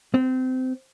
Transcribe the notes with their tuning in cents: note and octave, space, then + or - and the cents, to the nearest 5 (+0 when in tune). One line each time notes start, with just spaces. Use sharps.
C4 -25